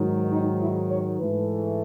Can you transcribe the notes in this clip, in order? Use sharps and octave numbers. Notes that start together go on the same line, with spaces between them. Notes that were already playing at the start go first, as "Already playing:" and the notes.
Already playing: G#2 D#3 F#3
D#4
E4
C#5
G#2 E3 A3 B4